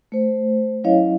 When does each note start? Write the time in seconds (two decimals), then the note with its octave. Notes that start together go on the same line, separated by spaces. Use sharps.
0.12 A3 C5
0.84 F#3 C#4 E4 C#5 D#5 F5